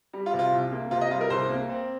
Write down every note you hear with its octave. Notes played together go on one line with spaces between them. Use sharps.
G3
F4
C3
F4
C2
A#3
C3 F4
D#5
G3 F4
A#4
C2 C5
A#3
C4